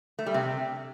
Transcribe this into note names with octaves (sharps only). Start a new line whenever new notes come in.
A3
G3
C3